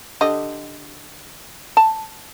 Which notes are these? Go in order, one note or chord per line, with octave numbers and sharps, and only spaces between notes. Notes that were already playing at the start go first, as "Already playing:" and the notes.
D3 G4 D#5
A5